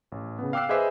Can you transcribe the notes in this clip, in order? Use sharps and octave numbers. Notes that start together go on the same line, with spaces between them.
A1
C#3 B3
F5 G5 D6 E6 F#6 C7
G#4 B4 C5 D#5 E5 D6